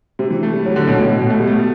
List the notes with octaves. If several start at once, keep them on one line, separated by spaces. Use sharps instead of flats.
C3
E3
A3
G3
F#3
D3
B2
A2
B2
B2
A3
G3
A3